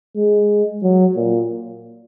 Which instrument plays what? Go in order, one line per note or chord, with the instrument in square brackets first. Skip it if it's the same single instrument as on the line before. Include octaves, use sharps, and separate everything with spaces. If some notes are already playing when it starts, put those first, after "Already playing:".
[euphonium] G#3
F#3
A#2